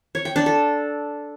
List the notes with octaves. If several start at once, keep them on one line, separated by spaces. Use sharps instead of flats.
C#5
G5
D4
A4